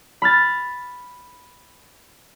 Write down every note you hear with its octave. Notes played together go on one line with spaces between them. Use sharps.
B5 F6 A6